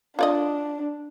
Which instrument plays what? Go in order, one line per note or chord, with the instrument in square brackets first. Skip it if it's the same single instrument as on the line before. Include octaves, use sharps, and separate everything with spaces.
[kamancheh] D4 [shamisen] F4 D5 D#5